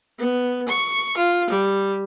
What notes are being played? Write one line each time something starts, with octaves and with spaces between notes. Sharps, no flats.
B3
C#6
F4
G3